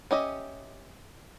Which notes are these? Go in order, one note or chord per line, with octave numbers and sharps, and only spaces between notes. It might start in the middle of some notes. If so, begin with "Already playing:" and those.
C#4 G4 D#5 E5